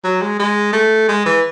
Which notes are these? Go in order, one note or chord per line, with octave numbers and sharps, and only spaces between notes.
F#3
G#3
G#3
A3
G#3
E3